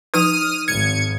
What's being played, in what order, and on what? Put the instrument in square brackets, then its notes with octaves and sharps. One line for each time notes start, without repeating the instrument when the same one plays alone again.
[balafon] F3 D#4 B4 [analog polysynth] D#6 F6 D#7
[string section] G#1 [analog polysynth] G#6 C#7